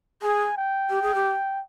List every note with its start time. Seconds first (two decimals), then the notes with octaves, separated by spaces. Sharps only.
0.22 G#4 G#5
0.57 G5
0.90 G4
1.02 G#4
1.15 G4